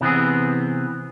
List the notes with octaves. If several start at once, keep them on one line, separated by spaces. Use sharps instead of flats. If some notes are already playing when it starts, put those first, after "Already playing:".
C3 E3 B3 C4 G#4